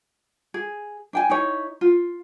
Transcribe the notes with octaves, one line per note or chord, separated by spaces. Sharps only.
G#4
D4 G5 G#5
D#4 E4 C#5
F4